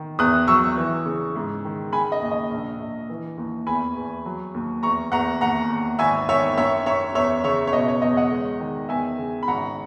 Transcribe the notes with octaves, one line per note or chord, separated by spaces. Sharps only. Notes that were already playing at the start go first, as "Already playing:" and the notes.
Already playing: D#3
E2 D#6 F#6
F#3 C#6 E6
E3
C#3
G#2
D#3
C#3 G#5 B5
D#5
D#2
D#5
A#1
A#1
E3
D#2
E2 G#5 B5
E2
F#3
D#2
E2 A#5 C#6
E2 F#5 A#5
D#2 F#5 A#5
D#2
G#1 E5 G#5
D#3 C#5 E5
F#2 C#5 E5
F#2 C#5 E5
E2 C#5 E5
C#3 C#5 E5
C#5
B2 D#5
C#5
E2 D#5
D#5 F#5
G#3
D#3
E2 E5 G#5
C#3
B5
G#1 F#5 A#5